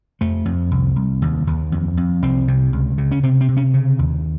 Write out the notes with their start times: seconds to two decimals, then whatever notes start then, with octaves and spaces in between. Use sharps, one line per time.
0.21 F2 A3
0.45 F2
0.71 C2
0.96 C2
1.22 D#2
1.47 D#2
1.72 F2
1.97 F2
2.23 C2 C4
2.48 C3
2.73 C#2
2.98 C#3
3.11 C#4
3.23 C3 C4
3.41 C4
3.48 C3
3.57 C#4
3.74 C#3
3.99 D#2